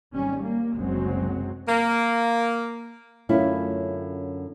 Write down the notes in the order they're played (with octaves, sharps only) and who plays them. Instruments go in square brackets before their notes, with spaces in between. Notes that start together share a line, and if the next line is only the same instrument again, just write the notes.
[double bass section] G#1 G3 C#4
A#3
F#1 C2 F#2 F#3 G#3 C4
[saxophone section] A#3
[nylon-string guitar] F#2 D3 A3 C#4 E4 F4